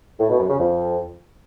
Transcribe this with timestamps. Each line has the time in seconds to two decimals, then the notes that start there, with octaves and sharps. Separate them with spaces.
0.20 A2
0.30 B2
0.40 F#2
0.49 C#3
0.59 F2